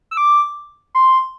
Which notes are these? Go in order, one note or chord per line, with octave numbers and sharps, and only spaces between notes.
E6
D6
C6